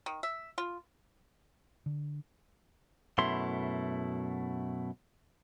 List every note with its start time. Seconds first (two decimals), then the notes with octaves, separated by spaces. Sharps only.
0.06 D#3
0.23 E5
0.58 F4
1.86 D3
3.18 F#2 B2 A3 E4 C6